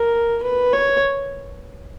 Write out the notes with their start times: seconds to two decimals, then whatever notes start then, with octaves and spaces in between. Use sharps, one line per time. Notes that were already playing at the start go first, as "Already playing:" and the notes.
Already playing: A#4
0.43 B4
0.73 C#5